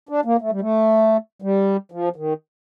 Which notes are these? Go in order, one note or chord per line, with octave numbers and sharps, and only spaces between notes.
D4
A#3
A3
G3
A3
G3
F3
D#3